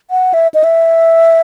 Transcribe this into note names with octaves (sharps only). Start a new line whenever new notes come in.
F#5
E5
D#5
E5